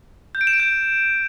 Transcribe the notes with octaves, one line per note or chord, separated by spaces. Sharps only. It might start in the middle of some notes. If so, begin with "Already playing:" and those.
G6
D7
E7
D7
G6